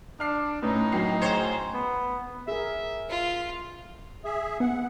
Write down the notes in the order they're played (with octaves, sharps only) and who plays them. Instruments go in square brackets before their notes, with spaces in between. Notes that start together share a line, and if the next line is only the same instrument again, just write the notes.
[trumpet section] D4 [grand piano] F6 C7
[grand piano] A2 C#4 [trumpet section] D#4 [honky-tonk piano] B4
[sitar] A#2 [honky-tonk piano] F#3 G5 C7
[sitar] G#2 C5 C#5
[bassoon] B3
[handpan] G#4 A#4 [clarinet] E5
[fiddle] F4
[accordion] G#4 E5
[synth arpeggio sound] B3 [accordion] F#5